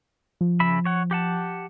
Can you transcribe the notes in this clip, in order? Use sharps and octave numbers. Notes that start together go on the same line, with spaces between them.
F3
C#3 E5 B5
C#5 F#5
G4 F#5 A5